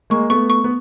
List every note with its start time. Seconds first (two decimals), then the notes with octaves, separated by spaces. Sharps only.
0.10 G#3 A#3 C#6
0.30 A3 B3 C#6
0.50 C#6
0.64 B3